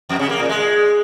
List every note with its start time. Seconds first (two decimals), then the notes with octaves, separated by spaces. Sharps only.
0.09 F2
0.19 C#3
0.29 A#3
0.39 A#2
0.49 G#3